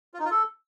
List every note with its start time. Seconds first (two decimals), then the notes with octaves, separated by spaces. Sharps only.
0.14 F4
0.20 D#4
0.25 F4
0.31 A4